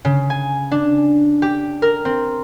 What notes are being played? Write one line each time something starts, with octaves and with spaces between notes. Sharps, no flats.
C#3
G#5
D4
G4
A#4
C4